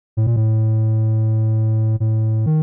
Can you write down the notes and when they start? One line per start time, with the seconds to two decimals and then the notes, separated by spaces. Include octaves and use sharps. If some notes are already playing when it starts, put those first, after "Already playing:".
0.17 A2
0.27 A#2
0.36 A2
2.00 A2
2.46 D#3